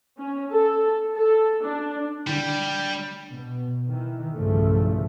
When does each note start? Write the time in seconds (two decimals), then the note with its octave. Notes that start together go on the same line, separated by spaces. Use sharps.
0.18 C#4
0.51 A4
1.16 A4
1.64 D4
2.27 D3 G3
3.30 B2
3.88 D#3 E3
4.34 B1 E2 G2 C#3 F3 A3